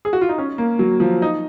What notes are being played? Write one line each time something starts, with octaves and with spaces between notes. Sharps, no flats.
G#4
F#4
F4
D#4
C#4
A#3
F#3
F3
D#4